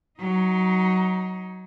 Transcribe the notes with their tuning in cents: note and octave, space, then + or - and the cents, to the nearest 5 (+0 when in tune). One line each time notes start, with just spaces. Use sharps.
F#3 +5 D#4 +20